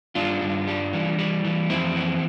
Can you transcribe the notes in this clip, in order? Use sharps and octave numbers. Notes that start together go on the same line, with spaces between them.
G2 D4 F4
G2
G3
E3
G3
E3
F2 C4 E4
E3